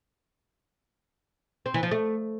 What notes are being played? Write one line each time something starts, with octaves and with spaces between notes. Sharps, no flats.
C4
E3
F3
A3